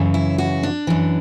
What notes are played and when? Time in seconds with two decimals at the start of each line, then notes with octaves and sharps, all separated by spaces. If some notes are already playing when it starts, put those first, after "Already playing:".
Already playing: F#2 C#3 E3
0.14 E4
0.38 F#4
0.63 D4
0.87 F#2 E3